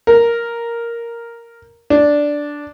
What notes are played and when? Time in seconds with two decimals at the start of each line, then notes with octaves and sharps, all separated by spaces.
0.07 A#4
1.90 D4